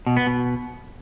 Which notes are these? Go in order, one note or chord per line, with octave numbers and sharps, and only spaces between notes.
B2
B3
B2